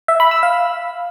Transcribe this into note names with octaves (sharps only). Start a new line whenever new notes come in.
E5
B5
E6
F5